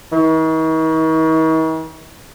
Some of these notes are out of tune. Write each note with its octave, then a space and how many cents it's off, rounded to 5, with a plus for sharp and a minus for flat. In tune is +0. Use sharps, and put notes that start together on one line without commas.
D#3 +45